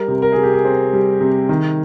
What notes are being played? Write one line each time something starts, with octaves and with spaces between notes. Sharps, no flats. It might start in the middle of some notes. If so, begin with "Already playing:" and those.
Already playing: G3 A#4
C3
A#4
C3 G#4
G4
G#4
C4
G3
C3
D#3